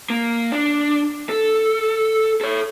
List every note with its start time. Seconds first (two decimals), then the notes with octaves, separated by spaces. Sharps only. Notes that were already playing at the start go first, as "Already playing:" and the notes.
0.10 A#3
0.52 D4
1.29 A4
2.41 A4 C#5